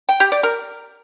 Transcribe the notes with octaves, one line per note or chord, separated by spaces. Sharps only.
G5
G4
D5
A#4